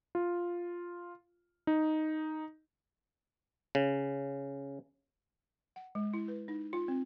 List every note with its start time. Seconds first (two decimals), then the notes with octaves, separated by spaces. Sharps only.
0.15 F4
1.67 D#4
3.75 C#3
5.76 F#5
5.95 G#3
6.14 E4
6.28 B4
6.48 D#4
6.73 F4
6.88 C4